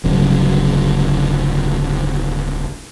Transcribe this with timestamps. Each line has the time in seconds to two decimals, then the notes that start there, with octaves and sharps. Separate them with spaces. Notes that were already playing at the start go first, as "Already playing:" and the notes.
0.04 D1 G1 C#3 F#3